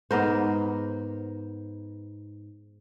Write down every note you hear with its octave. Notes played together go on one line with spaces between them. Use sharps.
G#2 B3 A#4 C5